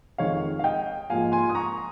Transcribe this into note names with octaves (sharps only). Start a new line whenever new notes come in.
F2 D#3 G#3 D#4 C#5 F5
F5
D#5 G5
G#2 F3 A#3 F4 F5 G#5
G#5 C6
D#6
A#5 C#6